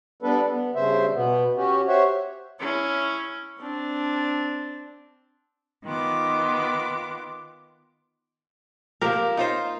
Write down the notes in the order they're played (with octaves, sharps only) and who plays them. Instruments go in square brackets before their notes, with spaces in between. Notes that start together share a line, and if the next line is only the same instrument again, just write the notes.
[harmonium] G3 B3 D4 A4 B4
B3
G2 C#3 C5 E5
B2 B3
C#4 F#4 G4
G4 C5 C#5 E5 F#5
[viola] C#4 E4
C4 D4
[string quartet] D#3 B3 F4 D6
[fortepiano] F3 G4 [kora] A#3 A#4
[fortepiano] D#4 F4 C5